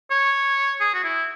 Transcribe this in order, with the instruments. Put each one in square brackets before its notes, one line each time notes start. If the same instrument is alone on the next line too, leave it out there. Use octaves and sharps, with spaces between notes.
[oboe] C#5
G#4
F#4
E4